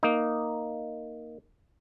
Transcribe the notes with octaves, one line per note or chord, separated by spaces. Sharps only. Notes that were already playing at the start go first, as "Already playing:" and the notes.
A#3 D#4